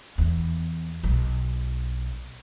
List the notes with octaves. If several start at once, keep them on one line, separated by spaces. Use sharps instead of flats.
E2
B1